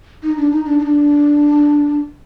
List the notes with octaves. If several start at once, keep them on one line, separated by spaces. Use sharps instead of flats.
D#4
D4
D#4
D4
D#4
D4